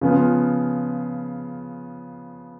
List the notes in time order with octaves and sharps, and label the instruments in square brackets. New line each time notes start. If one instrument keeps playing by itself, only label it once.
[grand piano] C#3 F3 B3 F4